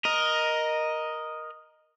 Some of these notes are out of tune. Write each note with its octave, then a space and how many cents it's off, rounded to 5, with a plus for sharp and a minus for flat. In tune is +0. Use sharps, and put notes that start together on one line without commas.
A#4 +10 D#5 +0